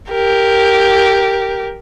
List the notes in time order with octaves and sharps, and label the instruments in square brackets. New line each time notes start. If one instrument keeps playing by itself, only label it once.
[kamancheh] G4 A#4